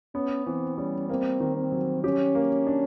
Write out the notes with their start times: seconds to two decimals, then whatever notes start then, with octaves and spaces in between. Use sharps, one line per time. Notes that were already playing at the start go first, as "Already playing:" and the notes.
0.15 B3 C#4
0.46 E3 C4
0.78 G3 C#4
1.09 A#3 C4
1.40 D#3
1.57 C4
1.72 F#3
2.04 C#4 G4
2.35 A#3
2.67 D4